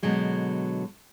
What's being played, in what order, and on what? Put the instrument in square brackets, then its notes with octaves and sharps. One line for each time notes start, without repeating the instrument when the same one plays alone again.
[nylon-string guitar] B2 D3 F#3 G#3